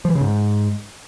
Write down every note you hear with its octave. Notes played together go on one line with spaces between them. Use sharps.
F3
E3
C#3
G#2